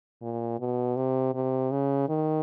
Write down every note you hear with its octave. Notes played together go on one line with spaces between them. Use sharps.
A#2
B2
C3
C3
C#3
D#3